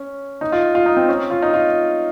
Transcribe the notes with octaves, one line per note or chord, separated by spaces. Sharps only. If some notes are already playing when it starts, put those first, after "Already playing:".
Already playing: C#4
D#4
F4
F4
D#4
C4
C#4
F4
D#4
F4